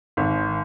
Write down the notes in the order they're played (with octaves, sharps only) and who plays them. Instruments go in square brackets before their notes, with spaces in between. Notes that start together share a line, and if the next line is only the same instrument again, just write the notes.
[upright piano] G#1